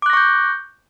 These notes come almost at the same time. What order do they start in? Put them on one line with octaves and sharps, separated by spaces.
D6 F#6 A#6 C#6 G6